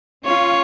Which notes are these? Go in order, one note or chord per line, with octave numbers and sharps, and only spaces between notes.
C#4 F4 C#5